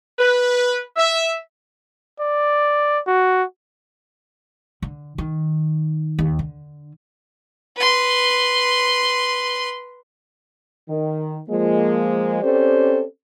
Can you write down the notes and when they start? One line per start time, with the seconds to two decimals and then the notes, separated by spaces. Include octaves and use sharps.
0.19 B4
0.97 E5
2.20 D5
3.07 F#4
4.82 D3
5.18 D#3
6.19 D#2
6.39 D3
7.76 B4 C6
10.89 D#3
11.49 F3 G#3 A#3
12.42 C4 C#4 G4 A4 C5 D5